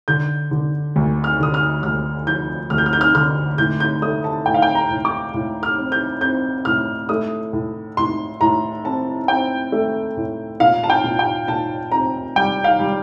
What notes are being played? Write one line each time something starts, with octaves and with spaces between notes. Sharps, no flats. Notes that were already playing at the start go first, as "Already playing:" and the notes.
D3 G6
D3
D2
F6
D3 D#6
F6
D2 F6
F3 G6
D2 F6
G6
F6
G6
F6
D3 F6
A2 G6
G6
A3 D#6
A5
A2 G5
F5
G5
A#5
A2
D6
A2
F6
C4
G6
C4 G6
A2 F6
A3 D#6
A2
A2 C6
A2 A#5
C4 A5
C4 G5
A3
A2
A#2 F5
A5
G5
A#2
G5
A#2 A5
C4 A#5
G3 G5
F5
G3